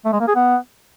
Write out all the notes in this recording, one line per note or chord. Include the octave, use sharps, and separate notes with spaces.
A3
G#3
A#3
G#4
B3